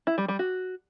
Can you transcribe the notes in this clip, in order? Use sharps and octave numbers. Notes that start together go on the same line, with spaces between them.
E4
G3
G3
F#4